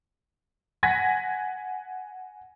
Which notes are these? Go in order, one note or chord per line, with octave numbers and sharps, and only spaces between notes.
F#5 G#5 G#6 A#6 B6